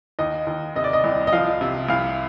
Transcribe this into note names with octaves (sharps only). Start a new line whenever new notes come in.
D#2 D#5
D#2
C3 D#5
D5
D#5
C2
D#5
F3 F5
C3
C2 F5